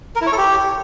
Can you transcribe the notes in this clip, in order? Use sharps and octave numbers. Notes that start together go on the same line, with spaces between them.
A#4
E4
C#5
A4
G4